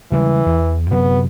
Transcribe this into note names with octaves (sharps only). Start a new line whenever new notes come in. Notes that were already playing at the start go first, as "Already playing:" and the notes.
C#3 E3 G3 G#3
E2
F#2 C3 F#3 B3